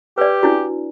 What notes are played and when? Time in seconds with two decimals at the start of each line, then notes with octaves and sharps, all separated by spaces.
0.18 G4 B4 D5
0.43 D4 E4 F#4